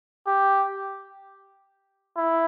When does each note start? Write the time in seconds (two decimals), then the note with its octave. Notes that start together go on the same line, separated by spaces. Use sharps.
0.27 G4
2.17 E4